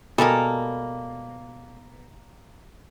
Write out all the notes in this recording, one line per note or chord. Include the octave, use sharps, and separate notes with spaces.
B2 G3 G#3 A#3 A4 A#4